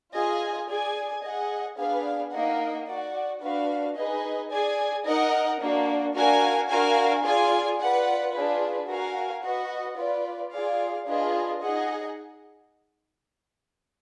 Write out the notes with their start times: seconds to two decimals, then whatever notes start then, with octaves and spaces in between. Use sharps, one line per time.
0.14 F4 G#4 D#5 G#5
0.69 G#4 D5 G#5
1.23 G#4 D#5 F#5
1.78 B3 D4 G#4 B4 F5
2.32 A#3 D#4 A#4 D#5 F#5
2.87 F#4 D5 F#5
3.42 D4 F#4 B4 F5
3.97 D#4 G#4 B4 D#5
4.51 G#4 D5 G#5
5.05 D#4 A#4 D#5 F#5
5.60 A#3 D4 F#4
6.15 D4 F#4 A#4 F5 G#5
6.69 D4 F#4 A#4 F5 G#5
7.25 F4 G#4 D5 G#5
7.80 F4 B4 D5 F#5
8.33 D4 F4 G#4 B4
8.88 F#4 A#4 F5 G#5
9.43 F#4 B4 D#5 F#5
9.98 F4 B4 D5
10.52 F4 G#4 D5 F5
11.07 D4 F4 G#4 B4 D#5
11.62 D#4 G#4 D#5 F#5